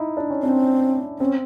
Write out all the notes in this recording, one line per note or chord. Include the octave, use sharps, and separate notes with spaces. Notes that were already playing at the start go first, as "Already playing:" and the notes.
Already playing: D#4 E4
D4
C#4
C4 D4
C4 C#4